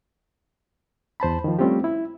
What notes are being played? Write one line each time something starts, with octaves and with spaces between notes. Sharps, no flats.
E2 C5 A5 B5
D#3 F3
G3 A3 C4 C#4 F4 G4
E4